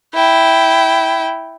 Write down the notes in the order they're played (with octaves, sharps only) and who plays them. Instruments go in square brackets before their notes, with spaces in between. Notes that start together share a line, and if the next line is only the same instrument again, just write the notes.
[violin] E4 G5